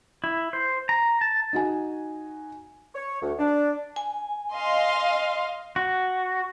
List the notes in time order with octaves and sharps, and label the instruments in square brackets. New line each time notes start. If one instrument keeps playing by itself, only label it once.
[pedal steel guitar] E4
C5
A#5
A5
[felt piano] D#4 F#4 G#5
[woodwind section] C#5
D2
D4
[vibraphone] G#5
[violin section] D#5 F5 C6
[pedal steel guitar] F#4